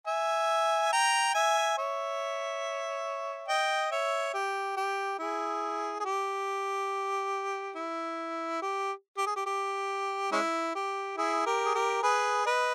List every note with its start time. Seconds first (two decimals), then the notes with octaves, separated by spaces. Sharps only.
0.07 E5 G#5
0.93 G5 A#5
1.34 E5 G#5
1.78 C#5 E5
3.48 D#5 G5
3.91 C#5 E5
4.34 G4
4.77 G4
5.19 E4 G#4
6.00 G#4
6.05 G4
7.76 E4
8.62 G4
9.18 G4
9.26 G#4
9.36 G4
9.46 G4
10.32 G#3 C#4 E4
10.75 G4
11.17 E4 G#4
11.46 G4 A#4
11.66 G#4
11.75 G4 A#4
12.02 G#4 B4
12.46 B4 D#5